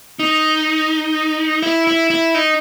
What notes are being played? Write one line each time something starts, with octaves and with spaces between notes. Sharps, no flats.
D#4
E4
E4
E4
D#4